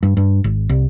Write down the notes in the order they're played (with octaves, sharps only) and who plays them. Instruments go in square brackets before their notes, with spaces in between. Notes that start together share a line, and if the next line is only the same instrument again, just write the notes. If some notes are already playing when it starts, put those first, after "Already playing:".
[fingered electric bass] G2
G2
G#1
C2